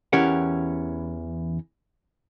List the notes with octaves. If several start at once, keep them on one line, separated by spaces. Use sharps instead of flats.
E2 E3 C#4 G4 A#4 F#5